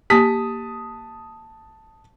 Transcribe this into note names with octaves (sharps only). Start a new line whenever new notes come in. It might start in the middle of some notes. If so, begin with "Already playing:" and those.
A#3 G4 A5 D#6 B6